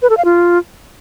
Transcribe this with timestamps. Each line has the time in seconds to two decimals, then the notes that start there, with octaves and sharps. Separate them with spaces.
0.02 B4
0.10 A4
0.17 F5
0.25 F4